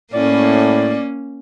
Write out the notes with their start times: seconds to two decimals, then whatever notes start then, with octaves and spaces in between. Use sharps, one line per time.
0.13 A2 A#3 C#4 D5